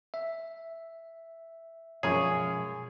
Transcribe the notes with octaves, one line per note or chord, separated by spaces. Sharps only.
E5
F#2 B2 F3 G#3 F4 G#4 C#5